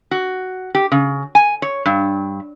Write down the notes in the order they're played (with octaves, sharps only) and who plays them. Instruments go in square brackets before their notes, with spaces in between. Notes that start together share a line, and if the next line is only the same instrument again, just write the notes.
[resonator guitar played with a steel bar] F#4
G4
C#3
G#5
C#5
G2